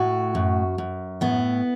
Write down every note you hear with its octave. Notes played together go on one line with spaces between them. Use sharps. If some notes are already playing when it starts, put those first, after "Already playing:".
Already playing: A2 F#4
F#2
F#2
A2 B3